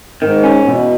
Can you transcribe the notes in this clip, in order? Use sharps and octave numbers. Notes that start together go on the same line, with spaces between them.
G#2 D#3
C#4
E2 B2